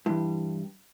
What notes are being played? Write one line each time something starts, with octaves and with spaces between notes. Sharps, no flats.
G2 E3 E4